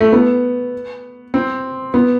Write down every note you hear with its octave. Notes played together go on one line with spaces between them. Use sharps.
A3
B3
C4
B3